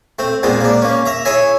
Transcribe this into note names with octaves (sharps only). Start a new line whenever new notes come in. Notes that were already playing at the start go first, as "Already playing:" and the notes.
A3 C4
A#2 G#3 B3 C4
A#3 D4
A#3 C#4
E5 A#5
E4 G#4 C#5 E5 G#5